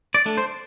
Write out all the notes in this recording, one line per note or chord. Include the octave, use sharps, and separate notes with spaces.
D5
A3 D4
C5